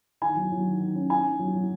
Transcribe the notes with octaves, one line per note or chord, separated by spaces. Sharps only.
D#3 G#5
F#3
F#3
D#3
D#3
C#4
D#4 G#5
D#4
F#3
F#3